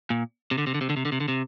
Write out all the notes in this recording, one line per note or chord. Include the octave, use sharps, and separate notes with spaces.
A#2
C3
D3
C3
D3
C3
D3
C3
D3
C3
D3
C3